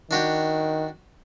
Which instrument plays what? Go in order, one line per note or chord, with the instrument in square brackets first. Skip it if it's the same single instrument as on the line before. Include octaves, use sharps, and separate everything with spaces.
[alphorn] D#3 [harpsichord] D4 F#4 G4